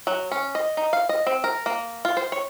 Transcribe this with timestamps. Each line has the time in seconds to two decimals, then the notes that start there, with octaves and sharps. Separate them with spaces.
0.07 F#3
0.31 C#4
0.55 D#5
0.77 D#4
0.93 F5
1.09 D#5
1.27 C4
1.44 A#4
1.66 A#3
2.05 F4
2.17 C5
2.32 C#5